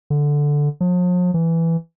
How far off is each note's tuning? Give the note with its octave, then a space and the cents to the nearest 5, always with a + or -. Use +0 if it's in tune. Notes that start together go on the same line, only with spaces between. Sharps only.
D3 -5
F3 +45
E3 +5